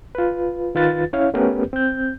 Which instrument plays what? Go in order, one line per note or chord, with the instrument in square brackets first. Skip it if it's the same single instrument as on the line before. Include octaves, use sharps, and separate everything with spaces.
[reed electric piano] F4 B4
D#3 F4 B4 A6
C#4 E4 C#5 F5
A3 B3 C#4 G4 A#4 B4
C4 G6